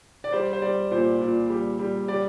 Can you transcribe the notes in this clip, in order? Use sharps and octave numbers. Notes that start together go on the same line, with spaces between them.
D5
G3 C5
C5
G3 D5
A#2 C5
A#2
G3
G3
G3 D5